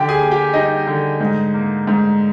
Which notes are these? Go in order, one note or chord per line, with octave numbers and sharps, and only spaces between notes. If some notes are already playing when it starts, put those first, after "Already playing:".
Already playing: D3 G4 G5
G#4 G#5
A#3
G4 G5
G3 D#4 D#5
D3
G#2
A#3
G#2